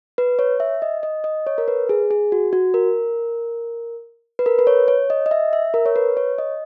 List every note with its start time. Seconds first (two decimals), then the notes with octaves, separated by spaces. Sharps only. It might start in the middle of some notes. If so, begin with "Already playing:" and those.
0.18 B4
0.39 C#5
0.60 E5
0.82 D#5
1.03 D#5
1.24 D#5
1.47 C#5
1.58 A#4
1.68 B4
1.89 G#4
2.11 G#4
2.32 F#4
2.53 F#4
2.74 A#4
4.39 B4
4.46 A#4
4.59 B4
4.67 C#5
4.88 C#5
5.10 D#5
5.26 D#5
5.31 E5
5.53 E5
5.74 A#4
5.86 C#5
5.96 B4
6.17 C#5
6.38 D#5